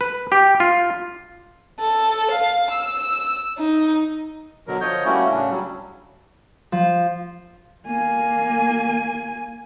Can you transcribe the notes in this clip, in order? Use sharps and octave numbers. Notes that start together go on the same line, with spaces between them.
B4
G4
F4
A4
F5
E6
D#4
B2 D3 F#3 A#4
D3 F3 C#5 D#5 G6
G3 A3 A#3 C#4 E4 F#4
A2 C#3 C#4 D4
F#3 G3
F3
A#3 G#5